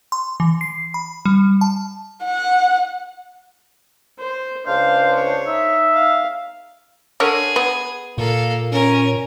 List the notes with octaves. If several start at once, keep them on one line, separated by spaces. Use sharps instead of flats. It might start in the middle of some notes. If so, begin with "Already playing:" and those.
C6
E3
C7
B5
G3
A5
F#5
C5
C#2 D4 C5 F5
C#5
D#4 E5
F5
D3 G#4 A#4 C#5
B3
A#2 A#3 A4 F5
C#4 A#4